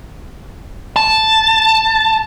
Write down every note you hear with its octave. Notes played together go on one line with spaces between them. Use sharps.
A5